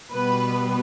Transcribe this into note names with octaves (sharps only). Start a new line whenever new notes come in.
B2 G3 B3 B4